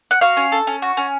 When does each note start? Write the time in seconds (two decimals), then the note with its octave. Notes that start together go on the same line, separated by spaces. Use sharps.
0.11 F#5
0.21 F#4 F5
0.37 C#4
0.52 A4
0.67 C#4
0.82 F#4
0.97 C#4